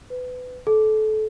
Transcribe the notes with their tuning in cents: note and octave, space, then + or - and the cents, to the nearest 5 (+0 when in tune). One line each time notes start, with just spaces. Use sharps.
B4 +25
A4 -25